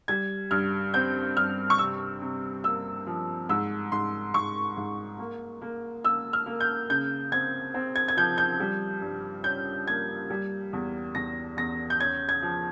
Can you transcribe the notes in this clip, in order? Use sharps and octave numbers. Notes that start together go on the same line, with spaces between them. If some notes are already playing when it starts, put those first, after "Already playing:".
G3 G#6
G2 F6
C4 G6
G2 F6
C#6
C3 E6
C3
A#3 E6
F3
G#2 E6
G#2 C6
G#2 C#6
G#2
A#3
A#3
A#3 E6
F6
A#3
G6
C#3 G6
C4 G#6
C4
G#6
G#6
F3 G6
G6
G3
G2
C#4 G6
A#3 G#6
G3
E2
E2 A#6
E2 A#6
G6
C#4 G#6
G#6
F3